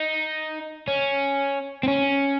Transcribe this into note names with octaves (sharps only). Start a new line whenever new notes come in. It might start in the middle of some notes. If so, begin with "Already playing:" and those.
Already playing: D#4
C#4
C4
C#4